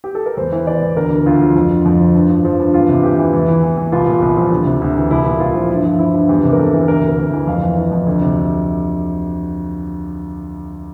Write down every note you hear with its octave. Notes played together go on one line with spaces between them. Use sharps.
G4
A4
A#4
E2 C5
E3
E3 D5
E2
D2 A#4
D3
D2 F4
F3
F2
D3
F2
F3
G2
F3
F3
G2
E2 F4
C3
E2 G4
E3
E2
E3
E3
E2
C2 F4
A#2
C2
F3
D2
C3
D2
E3
C2 E4
A#2
C2 F4
F3
G2 E4
F3
F3 E4
G2
E2 G4
C3
A#4
E2 A4
E3
D2 A#4
C3
D2
E3
F2 F5
E3
E3
F2
D2
C3